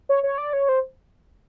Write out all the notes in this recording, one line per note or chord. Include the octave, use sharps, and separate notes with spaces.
C#5
C#5
D5
C#5
C5